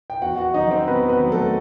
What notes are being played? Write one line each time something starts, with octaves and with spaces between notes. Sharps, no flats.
G5
E2 F#4 F#5
F#4 F#5
D#3 F#3 D#4 D#5
C4 C5
E2 B3 B4
B3 B4
D#3 F#3
A3 A4